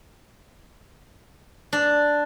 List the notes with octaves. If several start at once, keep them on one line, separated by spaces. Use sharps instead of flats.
D4